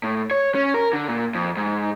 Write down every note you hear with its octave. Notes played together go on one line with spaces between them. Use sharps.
A2
C#5
C#4
A#4
D3
A#2
F2
G#2